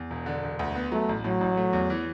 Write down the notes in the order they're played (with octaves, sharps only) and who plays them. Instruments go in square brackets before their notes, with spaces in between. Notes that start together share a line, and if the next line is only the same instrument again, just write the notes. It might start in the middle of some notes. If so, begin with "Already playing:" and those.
Already playing: [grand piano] E2
E1
D3
E1
D2
B3
[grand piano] F#3 [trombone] A3
[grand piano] A1
[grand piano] A2 [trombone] F#3
[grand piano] A1
A3
E2
E3